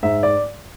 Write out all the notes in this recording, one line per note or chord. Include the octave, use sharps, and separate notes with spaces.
G#2 E5
D5